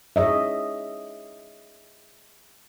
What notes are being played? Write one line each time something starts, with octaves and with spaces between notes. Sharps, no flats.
G#4 C#5 D#5 E5